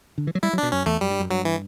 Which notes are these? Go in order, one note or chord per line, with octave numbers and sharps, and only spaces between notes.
D3
E3
F#3
G3 E4
F#3
B2 D4
F#2 C#4
E2 A3
F#2 G3
G2
F#2
G2 F#3
E3